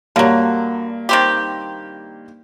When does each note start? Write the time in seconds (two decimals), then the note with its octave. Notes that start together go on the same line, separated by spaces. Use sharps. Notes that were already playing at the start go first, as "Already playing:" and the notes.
0.16 G2 D3 F#3 A#3
1.09 D#3 C4 G4